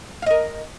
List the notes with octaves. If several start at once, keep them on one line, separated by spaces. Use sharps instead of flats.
A#4 D#5 F5